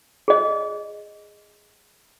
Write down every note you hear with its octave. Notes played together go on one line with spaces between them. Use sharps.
G#4 D#5